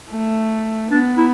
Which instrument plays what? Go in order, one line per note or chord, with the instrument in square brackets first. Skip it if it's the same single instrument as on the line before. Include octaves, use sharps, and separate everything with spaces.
[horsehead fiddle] A3
[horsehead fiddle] B3 [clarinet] D4
[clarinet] E4